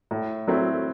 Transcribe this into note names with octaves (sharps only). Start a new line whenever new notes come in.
A2
F#3 A3 C4 E4